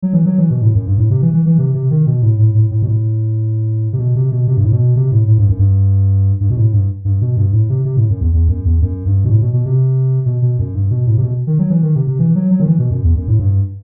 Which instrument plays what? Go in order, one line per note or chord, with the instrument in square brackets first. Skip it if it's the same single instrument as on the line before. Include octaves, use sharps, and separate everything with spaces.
[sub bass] F#3
E3
F#3
E3
B2
A2
F#2
G2
A2
C3
E3
E3
E3
C3
C3
D#3
B2
A2
A2
A2
A2
B2
A2
C3
B2
C3
B2
C3
G2
A2
B2
C3
A2
A2
G2
F#2
G2
G2
B2
A2
G2
G2
B2
G2
A2
C3
C3
A2
F#2
E2
E2
F#2
E2
F#2
G2
B2
A2
B2
B2
C3
B2
B2
F#2
G2
B2
A2
C3
B2
D#3
F#3
E3
D#3
C3
C3
E3
F#3
F#3
D#3
E3
B2
F#2
E2
F#2
A2
G2